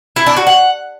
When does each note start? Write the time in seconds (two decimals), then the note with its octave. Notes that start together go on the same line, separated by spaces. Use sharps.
0.16 E4
0.26 D4
0.37 F#4
0.47 F#5